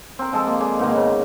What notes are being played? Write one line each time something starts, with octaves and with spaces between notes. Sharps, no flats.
C4 A#4
F3 G#3 A4
A#3
G#3 D5
G#2 B2 D#3 A#3
C#3